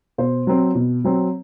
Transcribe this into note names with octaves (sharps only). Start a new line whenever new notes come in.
B2 C5
F#3 C4
B2
F#3 C4